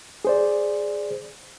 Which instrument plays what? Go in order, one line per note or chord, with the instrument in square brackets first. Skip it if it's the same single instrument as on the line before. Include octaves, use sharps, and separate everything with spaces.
[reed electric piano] G#4 C5 D5